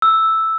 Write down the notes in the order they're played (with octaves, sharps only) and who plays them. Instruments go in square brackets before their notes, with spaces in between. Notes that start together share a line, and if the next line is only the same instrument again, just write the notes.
[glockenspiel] E6